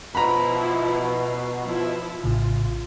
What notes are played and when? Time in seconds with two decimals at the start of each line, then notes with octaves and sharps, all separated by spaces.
0.15 B2 F3 E4 A#5 B5
1.64 F3 E4
2.24 A#1 A2 C#3 F4